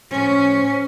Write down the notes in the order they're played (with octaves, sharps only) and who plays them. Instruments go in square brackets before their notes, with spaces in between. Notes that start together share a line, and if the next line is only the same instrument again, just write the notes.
[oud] A2 F3 [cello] C#4